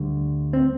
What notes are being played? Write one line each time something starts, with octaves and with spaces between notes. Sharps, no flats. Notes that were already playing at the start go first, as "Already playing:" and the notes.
Already playing: D2 D3 G3
C4